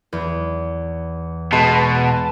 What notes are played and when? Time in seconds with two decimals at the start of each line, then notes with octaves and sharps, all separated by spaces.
0.13 E2
1.52 B2 G#3 B4 A5